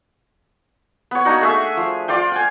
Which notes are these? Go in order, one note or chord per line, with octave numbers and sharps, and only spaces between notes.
B3 C#5
A#3 D4 D#4 F#4
A3 G#4 E5
F3
F4 D5 F5 G5
F#5 G#5